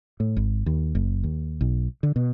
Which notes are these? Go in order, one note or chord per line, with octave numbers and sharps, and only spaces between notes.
A2
G#1
D#2
F#1
D#2
B1
D3
B2